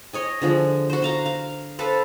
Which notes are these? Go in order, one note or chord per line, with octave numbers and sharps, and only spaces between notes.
C#5 D#5 G#5
D3 F3 G#3
F#4 C5
C5 F5 A#5
F5
A4 B4 C5 F5